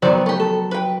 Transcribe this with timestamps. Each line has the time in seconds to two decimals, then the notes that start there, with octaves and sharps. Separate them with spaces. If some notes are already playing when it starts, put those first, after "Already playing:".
0.02 D#3 F#3 B3 C5 D5
0.26 A3 G4
0.40 A4
0.71 B4 G5